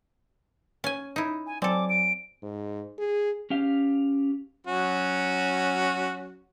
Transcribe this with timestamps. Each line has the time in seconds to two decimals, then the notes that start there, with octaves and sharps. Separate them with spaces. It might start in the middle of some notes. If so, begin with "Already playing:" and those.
0.84 C#4 G#5
1.16 D#4 E4
1.46 G#5
1.62 F#3 C4 A4 D5 G#5 D6
1.89 D7
2.43 G#2
2.99 G#4
3.50 C#4 G4 F5
4.67 F#3 C#4 F#4